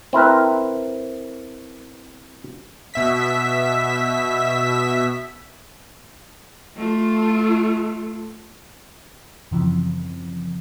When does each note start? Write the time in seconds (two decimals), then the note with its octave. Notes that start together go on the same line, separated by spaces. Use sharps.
0.13 C4 E4 A#4 B4
2.94 B2 E5 B6
6.76 A3 F4
9.51 F#2 C#3 E3 F3 C4